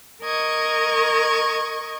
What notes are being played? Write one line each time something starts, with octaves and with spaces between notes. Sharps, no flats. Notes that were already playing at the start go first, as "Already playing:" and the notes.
A#4 D#5 C#6 G#6